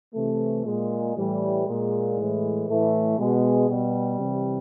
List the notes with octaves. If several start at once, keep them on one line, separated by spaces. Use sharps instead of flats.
C3 E3 A3
A#2 G#3
A2 E3 G3
A#2 G#3
A2 E3
A2 E3 A3
B2 G#3
B2 G3
C3 E3